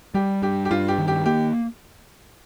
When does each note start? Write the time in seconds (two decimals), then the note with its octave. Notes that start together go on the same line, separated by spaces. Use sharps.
0.14 G3 G4
0.42 G2 G4
0.65 G4
0.71 G2 F4
0.88 G4
0.98 D#3
1.08 G4
1.26 A#3 G4